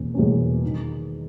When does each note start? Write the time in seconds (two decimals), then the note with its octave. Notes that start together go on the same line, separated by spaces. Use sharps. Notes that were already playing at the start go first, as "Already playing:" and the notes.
Already playing: E2 B2 A#3 C#4
0.14 E2 B2 A#3 C#4
0.64 D#3